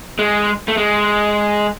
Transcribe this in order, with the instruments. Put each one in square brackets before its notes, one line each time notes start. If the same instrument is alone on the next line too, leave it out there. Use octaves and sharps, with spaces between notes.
[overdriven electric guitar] G#3
A3
G#3